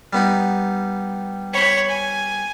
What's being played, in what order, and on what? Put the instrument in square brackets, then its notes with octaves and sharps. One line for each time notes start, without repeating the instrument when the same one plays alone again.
[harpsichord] G3 B3 D#4
[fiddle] C#5 B5
G#5